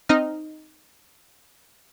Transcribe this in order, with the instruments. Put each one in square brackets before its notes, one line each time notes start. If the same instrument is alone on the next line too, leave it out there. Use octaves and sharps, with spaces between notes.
[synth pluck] C4 D#4 D#5 F6